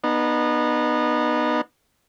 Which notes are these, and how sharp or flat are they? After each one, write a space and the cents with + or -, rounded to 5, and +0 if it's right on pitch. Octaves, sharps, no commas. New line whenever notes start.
B3 -15 D#4 -30